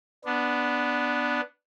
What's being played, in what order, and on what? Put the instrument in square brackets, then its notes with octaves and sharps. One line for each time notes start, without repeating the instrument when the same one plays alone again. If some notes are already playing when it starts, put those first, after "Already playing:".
[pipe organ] B3 D4